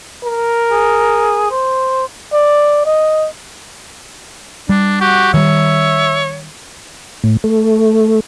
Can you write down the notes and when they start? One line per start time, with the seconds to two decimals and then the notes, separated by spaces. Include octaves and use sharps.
0.25 A#4
0.71 G#4
1.51 C5
2.33 D5
2.86 D#5
4.69 G3 D4
5.01 F#4 G4
5.34 D#3 G3 C#5 E5
7.24 A2
7.44 A3